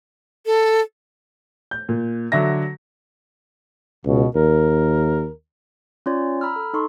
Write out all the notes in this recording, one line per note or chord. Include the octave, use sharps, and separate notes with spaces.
A4
G6
A#2
D3 F#3 E5 A#6
C#2 B2
D#2 A#4
C#4 F4 C#5 D5
A#5 B5 E6 F6
A4
D#4 A4 C6 C#6